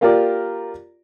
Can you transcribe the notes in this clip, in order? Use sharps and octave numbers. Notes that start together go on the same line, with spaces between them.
A#3 F4 G4 A#4 D5